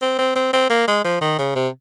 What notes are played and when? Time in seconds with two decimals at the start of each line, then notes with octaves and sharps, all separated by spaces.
0.02 C4
0.19 C4
0.36 C4
0.53 C4
0.70 A#3
0.88 G#3
1.04 F3
1.21 D#3
1.39 C#3
1.55 C3